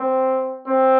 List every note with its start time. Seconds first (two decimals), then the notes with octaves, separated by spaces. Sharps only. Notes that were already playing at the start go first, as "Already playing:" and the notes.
Already playing: C4
0.66 C4